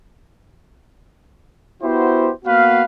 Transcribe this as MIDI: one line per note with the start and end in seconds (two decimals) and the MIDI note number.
1.82 2.30 59
1.82 2.30 64
1.82 2.30 66
1.82 2.30 67
1.82 2.30 72
2.45 2.82 58
2.45 2.82 59
2.45 2.82 66
2.45 2.82 71
2.45 2.82 77